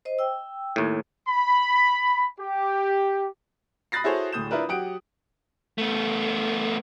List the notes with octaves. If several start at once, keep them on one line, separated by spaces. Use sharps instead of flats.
C5 D#5
G5 E6
D#2 A2
B5
G4
B5 D#6 F#6 A6 A#6 C7
E4 F#4 G#4 A4 C5 C#5
D1 A2 D#6 G6 E7
D4 E4 F4 A#4 B4
F#3 G4 F#5 D#6 D7
A3 B3